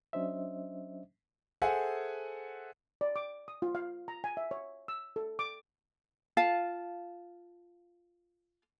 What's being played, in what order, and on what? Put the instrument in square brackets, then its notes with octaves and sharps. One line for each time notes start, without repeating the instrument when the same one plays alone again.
[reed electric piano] F#3 C#4 D4 C5 D#5 E5
[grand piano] G#4 A4 C5 E5 F#5 G#5
[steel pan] D5
D6
D#6
F4
F5
A#5
G#5
E5
C#5
E6
A4
D6
[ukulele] F4 F5 A5